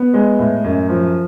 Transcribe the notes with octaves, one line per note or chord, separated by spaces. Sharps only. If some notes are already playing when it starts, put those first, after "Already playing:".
Already playing: B3
G#3
A2
F#2
F3